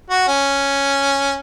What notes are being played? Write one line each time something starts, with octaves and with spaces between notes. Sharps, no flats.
F#4
C#4